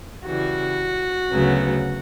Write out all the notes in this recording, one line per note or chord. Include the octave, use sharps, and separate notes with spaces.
C#3 E3 G3 F#4
D2 C#3 F#3 B3